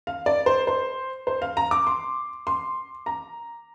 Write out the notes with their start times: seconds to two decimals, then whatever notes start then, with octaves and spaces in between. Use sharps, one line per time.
0.07 F5
0.26 D5
0.46 C5
0.67 C5
1.27 C5
1.42 F5
1.57 A#5
1.71 D6
1.87 C6
2.47 C6
3.06 A#5